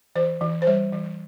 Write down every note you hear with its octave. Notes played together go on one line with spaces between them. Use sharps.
E3 C5
E3
C5
G3 C#5
E3